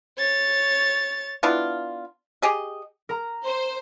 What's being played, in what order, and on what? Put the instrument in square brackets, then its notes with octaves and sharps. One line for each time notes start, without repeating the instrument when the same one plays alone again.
[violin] C#5 A6
[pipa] B3 D4 E4 F4
G4 G#4 D#5
[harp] A#4 A#5
[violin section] C5